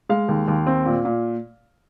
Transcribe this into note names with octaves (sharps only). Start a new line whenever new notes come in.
G#3 F5
D#2
D#2
C4
A#2
A#2